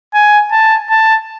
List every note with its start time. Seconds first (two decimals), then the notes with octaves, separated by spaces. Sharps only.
0.14 G#5
0.52 A5
0.90 A5